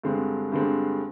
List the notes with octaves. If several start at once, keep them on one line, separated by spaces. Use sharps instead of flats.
G2 D3 G#3 C4
G2 D3 G#3 C4